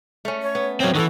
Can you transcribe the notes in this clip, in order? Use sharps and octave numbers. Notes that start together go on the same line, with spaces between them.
A3 C#4
C#5
B3
F#3 C4 C#5
D#3 E3 F#4 A4